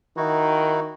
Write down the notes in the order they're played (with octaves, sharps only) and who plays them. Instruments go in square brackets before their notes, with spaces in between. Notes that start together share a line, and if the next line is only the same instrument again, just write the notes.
[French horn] D#3 [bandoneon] D#4 E4 F#4